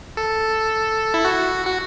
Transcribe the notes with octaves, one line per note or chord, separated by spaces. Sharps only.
A4
E4
F#4
F#4